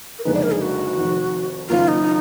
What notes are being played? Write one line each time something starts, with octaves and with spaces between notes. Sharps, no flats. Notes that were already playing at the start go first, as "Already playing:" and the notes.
A#4
F#1 F2 D3 G#3 D#4 B4
D5
A#4
G#4
F#4
F1 F2 D#3
F#1 F#2 D#3 F#3 A#3 F4
D#4